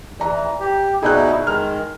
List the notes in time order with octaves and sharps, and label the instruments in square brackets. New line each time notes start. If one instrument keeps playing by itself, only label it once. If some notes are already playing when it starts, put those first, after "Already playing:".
[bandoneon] E3 [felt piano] D5 A#5
[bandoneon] G4
[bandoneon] B2 D#4 E4 [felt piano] G#4 D5 F#6
[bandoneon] D#3 G#3 [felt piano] F6